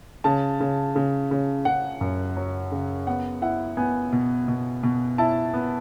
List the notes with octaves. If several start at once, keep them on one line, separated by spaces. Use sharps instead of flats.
C#3 A5
C#3
C#3
C#3
C#3 F#5
F#2
F#3
C#3
B3 F#5
E4 F#5
B3 G#5
B2
B2
B2
E4 A5
B3